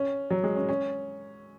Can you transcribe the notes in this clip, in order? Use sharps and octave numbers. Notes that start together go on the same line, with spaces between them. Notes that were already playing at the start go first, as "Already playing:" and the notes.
Already playing: C#4
F#3
G#3
C#4
C#4